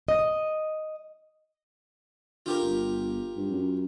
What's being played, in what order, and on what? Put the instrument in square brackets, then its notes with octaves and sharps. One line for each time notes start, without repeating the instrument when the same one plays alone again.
[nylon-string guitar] D#5
[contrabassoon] D3 [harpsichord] F4 G4 A#4
[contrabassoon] G1
G2
F#2